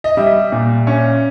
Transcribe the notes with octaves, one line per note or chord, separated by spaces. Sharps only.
D#5
G3 E5
A#2
C#4